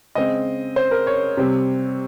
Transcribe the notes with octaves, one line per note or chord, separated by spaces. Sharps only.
C#3 G#3 C4 D#5
C5
A#4
C#5
C3 G3 C4